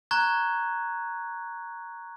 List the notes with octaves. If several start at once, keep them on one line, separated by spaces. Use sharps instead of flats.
A#5 C#6 F#6 G#6